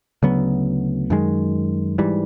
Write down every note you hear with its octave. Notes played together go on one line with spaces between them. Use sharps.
D2 C#3 F#3 B3
F#2 D#3 G#3
G#2 E3 G3